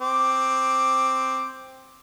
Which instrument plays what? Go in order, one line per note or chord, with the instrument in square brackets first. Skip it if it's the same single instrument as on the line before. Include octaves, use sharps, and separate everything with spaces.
[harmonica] C4 D6